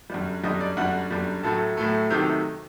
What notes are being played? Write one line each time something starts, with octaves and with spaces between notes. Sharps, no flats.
F#2 D3 G3
F#2 D3 G3 D#5
D5
F#2 D3 G3 F#5
F#2 D3 G3
A2 F#3 A3 A4
A2 F#3 A3
C3 D#3 F#3 A3 G4